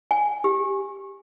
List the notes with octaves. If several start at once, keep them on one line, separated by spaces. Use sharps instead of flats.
G#5
G4